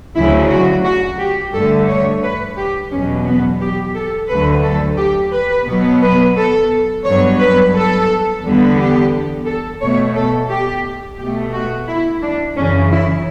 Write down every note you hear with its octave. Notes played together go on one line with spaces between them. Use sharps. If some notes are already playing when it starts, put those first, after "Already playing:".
D2 C#3 F#3 E4
F#4
F#4
G4
G2 D3 A3 A4
C#5
B4
G4
E2 B2 F#3 C#4
B3
G4
A4
D2 D3 F#3 A3 B4
A4
G4
B4
B2 F#3 B3
B4
A4
G2 F#3 B3 C#5
B4
A4
E2 D3 G3 B3
G4
A4
B2 A3 C#5
A4
G4
B2 A3 G4
F#4
E4
D4
F#2 C#3 E3 C#4
E4